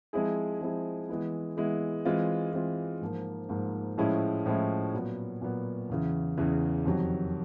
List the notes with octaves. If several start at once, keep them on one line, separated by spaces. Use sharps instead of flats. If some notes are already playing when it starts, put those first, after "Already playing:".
F3 G#3 C4 E4 G#4
F3 G#3 C4 E4 G#4
E3 G#3 B3 E4
E3 G#3 B3 E4
E3 G#3 C4 F4
E3 G#3 C4 F4
G#2 F3 A#3
G#2 F3 A#3
A2 F3 G#3 C#4 E4
A2 F3 G#3 C#4 E4
A#2 F#3 B3
A#2 F#3 B3
E2 C#3 E3
E2 C#3 E3
F2 C3 D#3 F#3